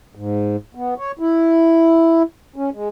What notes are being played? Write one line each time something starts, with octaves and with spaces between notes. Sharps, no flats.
G#2
B3
C#5
E4
C#4
G#3